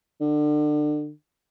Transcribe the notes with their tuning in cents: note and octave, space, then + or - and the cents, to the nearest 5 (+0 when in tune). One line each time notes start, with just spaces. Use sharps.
D3 +30